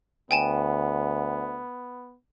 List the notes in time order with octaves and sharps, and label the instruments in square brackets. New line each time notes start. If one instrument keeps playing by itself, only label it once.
[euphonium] D2 [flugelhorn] B3 [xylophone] G5 G#5 E7